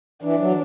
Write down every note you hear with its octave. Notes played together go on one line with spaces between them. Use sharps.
E3 D4
F#3